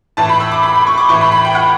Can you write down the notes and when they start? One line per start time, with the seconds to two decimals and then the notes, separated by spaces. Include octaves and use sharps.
0.17 A2 E3 A5
0.29 B5
0.40 E6
0.51 D6
0.63 B5
0.76 B5
0.87 C#6
0.98 D6
1.09 A2 E3 C#6
1.21 B5
1.32 B5
1.45 G5
1.55 F#5